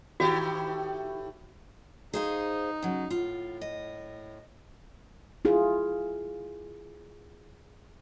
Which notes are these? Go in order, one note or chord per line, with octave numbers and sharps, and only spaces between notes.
A2 D#3 F#4 G4
D#4 G#4 C5 F5
C#3 F#3
A2 F4
D#5
E4 F4 G#4